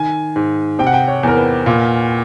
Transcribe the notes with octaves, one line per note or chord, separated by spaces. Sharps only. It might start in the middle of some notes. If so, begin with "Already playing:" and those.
Already playing: D#3 G#5
G#2
C3 G5
F#5
G5
C#5
E2 A#4
B4
A#2